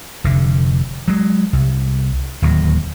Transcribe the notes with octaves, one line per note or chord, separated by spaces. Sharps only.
F1 D3
F#3 G#3
C2
D1 D#2 F#3